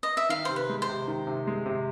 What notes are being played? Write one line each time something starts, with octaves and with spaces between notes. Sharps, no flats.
D#5
E5
D#3 F5
C3 C5
B4
G#3
C5
C3
D#3
C3
G#3
C3